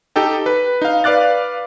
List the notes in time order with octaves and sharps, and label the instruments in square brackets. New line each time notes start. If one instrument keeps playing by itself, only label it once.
[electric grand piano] D#4 G4 A4 G5
B4
D#4 F5
B4 D5 F5 D6 F#6 A6